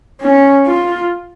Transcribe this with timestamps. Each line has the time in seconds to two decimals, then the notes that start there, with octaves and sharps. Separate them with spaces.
0.21 C#4
0.67 F4